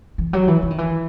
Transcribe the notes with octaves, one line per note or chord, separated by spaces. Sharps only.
E3
F#3
E3
E3
D#3
E3